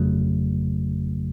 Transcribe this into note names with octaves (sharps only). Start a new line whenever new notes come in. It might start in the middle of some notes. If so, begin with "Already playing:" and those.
Already playing: G1 F2 C#3 F#3 A3